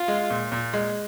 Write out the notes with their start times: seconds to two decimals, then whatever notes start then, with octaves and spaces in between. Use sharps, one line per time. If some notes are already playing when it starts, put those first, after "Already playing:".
Already playing: F4
0.08 G#3
0.30 A#2
0.52 A#2
0.73 G#3